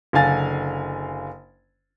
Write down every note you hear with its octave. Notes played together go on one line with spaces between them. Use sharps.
F#1 D3 F5 G#5 A6